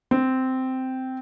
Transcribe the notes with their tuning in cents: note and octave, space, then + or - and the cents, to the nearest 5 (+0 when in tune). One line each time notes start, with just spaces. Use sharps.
C4 -10